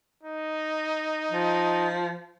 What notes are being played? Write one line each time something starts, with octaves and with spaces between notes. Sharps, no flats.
D#4
F3